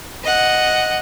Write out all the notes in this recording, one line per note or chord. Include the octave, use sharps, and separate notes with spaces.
D#5 F#5